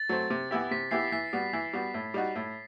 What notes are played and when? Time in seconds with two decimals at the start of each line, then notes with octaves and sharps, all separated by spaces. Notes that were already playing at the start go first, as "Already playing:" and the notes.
Already playing: A6
0.09 F#3 A3 C4
0.30 C3
0.51 E3 B3 E4 G4
0.71 C3 B6
0.91 E3 B3 E4 G4 C7
1.12 E3 B6
1.33 G3 B3 F#4
1.53 E3
1.73 G3 B3 F#4
1.94 A2
2.14 G3 D#4 F#4
2.35 A2